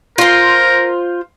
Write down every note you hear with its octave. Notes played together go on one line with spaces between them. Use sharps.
F4 A#4 C5